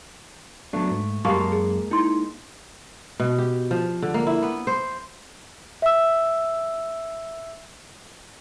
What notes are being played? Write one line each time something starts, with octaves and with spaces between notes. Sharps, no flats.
F#3 A3 B3 D4
G#2
F#2 G#3 A#3 G4 F5 A5 C#6
G#4
D#4 E4 C6
B2
G4
F3
D3
A#3
E4
B3
C5
E5 E6